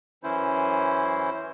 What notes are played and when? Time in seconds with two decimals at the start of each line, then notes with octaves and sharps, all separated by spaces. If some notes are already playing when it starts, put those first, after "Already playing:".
0.24 F#2 E3 C#4 E4 C5